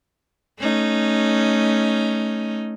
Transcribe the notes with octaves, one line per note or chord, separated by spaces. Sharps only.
A3 C#4 D#4